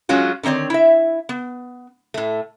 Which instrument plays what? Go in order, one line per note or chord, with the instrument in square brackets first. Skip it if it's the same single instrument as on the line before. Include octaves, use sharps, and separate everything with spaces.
[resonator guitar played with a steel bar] F#3 G#3 C#4 F4 F#4
D3 D#3 C4 C#5 D5
E4 E5
B3
A2 A3